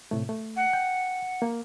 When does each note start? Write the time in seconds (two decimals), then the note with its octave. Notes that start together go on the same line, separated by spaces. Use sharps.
0.11 A2 C3 A3
0.29 A3
0.57 F#5
0.73 G5
1.42 A#3